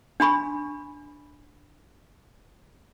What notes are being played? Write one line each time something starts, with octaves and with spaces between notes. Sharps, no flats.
D4 G#5 B5 C#6